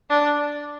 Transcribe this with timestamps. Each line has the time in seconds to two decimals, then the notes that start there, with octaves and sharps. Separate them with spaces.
0.10 D4